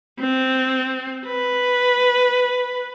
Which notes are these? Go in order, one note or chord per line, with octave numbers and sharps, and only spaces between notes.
C4
B4